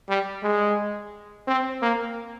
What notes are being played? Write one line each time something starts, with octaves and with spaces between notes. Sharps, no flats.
G3
G#3
C4
A#3